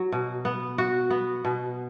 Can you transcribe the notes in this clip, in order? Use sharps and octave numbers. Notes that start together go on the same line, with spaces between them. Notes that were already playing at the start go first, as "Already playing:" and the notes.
Already playing: F#3
B2
B3
F#4
B3
B2